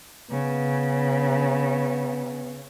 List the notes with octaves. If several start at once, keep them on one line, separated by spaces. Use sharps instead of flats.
C#3 B3